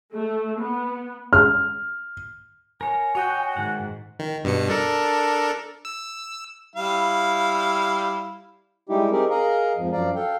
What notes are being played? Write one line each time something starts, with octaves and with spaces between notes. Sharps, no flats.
A3
B3
F6
A#4 C#5 G#5
F#4 C#5 D#5 G5
G#2 D#3 F#5
D#3
G2 B2 C#7
D4 A4 A#4
E6
G3 E4 F5
G3 G#3 D#4 E4 G4
C4 D#4 G4 G#4 A#4
G#4 A#4 D#5 F5 A#5
F2 G#2 F3
F#2 F3 D5 F5 A#5
A4 F5 G5